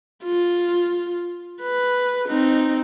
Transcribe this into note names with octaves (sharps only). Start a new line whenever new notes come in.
F4
B4
C4 D#4